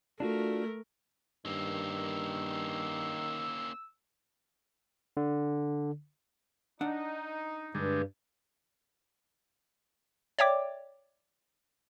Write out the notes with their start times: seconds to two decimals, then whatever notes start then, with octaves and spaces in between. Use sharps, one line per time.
0.20 A3 D4 F4 F#4 A#4
1.46 G2 D#3 A#3 C#4 E6
5.17 D3
6.81 D4 D#4 F#5
7.75 G2 D3 G3 G#3
10.39 C#5 D5 E5 G5 D6